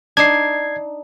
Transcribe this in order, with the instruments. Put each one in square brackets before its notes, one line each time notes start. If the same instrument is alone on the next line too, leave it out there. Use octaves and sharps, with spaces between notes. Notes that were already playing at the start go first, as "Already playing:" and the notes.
[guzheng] D4 D#4 [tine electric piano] G#6 C7